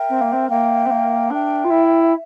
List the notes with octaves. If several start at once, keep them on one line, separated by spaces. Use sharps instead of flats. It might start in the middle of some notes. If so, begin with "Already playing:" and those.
Already playing: A#4 E5 G5
C4
A#3
C4
A#3 A#4 E5 G5
C4
A#3
D4 A#4 E5 G5
F4
E4
E5